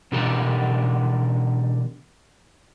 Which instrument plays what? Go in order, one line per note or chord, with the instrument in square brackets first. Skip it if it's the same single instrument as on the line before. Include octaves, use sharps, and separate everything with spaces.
[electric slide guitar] B2 D3 E3 G4 A4 A#4